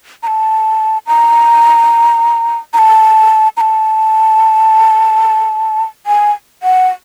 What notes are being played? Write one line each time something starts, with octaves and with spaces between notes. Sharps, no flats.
A#5
A5
A#5
A#5
A5
A#5
A5
G#5
F#5